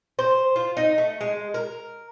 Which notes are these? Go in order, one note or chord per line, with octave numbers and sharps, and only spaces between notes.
C5
F4
D#4
A3
G#3
A#4